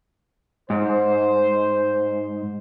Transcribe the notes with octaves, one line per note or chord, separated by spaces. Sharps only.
G#2 C5